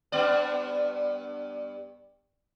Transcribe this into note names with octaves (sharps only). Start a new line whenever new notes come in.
G2 B3 D5